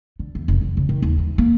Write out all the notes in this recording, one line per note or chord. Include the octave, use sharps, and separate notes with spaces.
D3
E2
F1
F#3
C#3
D#3
D#2
E3
A#3